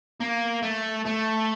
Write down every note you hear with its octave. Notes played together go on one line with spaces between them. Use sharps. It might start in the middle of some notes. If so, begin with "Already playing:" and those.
A#3
A3
A3